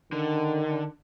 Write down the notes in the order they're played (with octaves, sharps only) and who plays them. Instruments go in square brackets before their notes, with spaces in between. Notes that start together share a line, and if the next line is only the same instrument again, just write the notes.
[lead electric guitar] D3 [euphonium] D#3